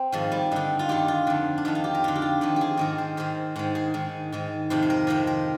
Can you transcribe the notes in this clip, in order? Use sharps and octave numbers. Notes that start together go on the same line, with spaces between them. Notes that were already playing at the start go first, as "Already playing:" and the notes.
Already playing: C4
G#2 D#3 F3
G3
G2 D3 D#4
F4
G2 D#3 G4
F4
F2 D3
D4
F2 D#3 D#4
F4
G4
A#4
F2 D3 F4
G4
F4
F2 D#3 G4
G4 G#4
G#2 D#3 A#4
C5
G#2 D#3 C5
G#2 D#3 C5
G#4
G#2 D#3
G#2 D#3
F2 C3 D#3 C5
C5
A#4
F2 C3 D#3 C5
A#4